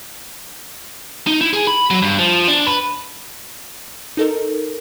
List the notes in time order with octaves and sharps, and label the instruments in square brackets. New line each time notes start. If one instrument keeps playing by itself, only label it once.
[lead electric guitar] D#4
E4
G#4
B5
F#3
G2
F3
D4
B4
[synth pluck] D#4 A4 A#4